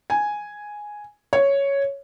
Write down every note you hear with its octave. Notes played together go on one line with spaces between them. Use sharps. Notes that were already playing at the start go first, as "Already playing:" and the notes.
G#5
C#5